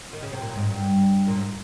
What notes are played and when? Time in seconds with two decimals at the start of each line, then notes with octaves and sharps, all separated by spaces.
0.13 D#3
0.23 C#3
0.32 C3
0.41 A#2
0.51 G2
0.56 G#2
0.70 G2
1.27 A#2
1.37 G#2